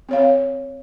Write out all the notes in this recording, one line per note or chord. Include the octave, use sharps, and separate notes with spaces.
C4 C#5 F5